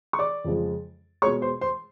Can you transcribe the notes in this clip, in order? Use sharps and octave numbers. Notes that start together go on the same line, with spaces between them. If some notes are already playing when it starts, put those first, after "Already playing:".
C#6
D5 D6
F2 C#3 F3 G#3
B2 G#3 C#5 C#6
C5 C6
C5 C6